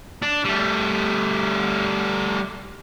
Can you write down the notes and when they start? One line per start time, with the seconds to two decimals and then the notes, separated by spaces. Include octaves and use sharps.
0.22 D4
0.45 G3 A3